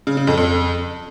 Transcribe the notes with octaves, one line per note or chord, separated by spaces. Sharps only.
C#3
C#3
F2
F2